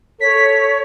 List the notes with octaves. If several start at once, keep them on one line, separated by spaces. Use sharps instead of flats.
A4 C#5 B6